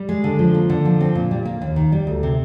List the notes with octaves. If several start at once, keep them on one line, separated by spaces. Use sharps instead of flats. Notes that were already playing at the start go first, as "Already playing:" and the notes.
Already playing: G3
G#3
D3
F3
A#3
D3
F3
C4
A#2
G3
A#3
D#2
D#3
G3
D2
C3